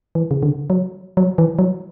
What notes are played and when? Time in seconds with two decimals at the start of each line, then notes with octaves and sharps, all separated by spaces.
0.15 E3
0.31 C#3
0.43 D3
0.70 F#3
1.17 F#3
1.38 E3
1.59 F#3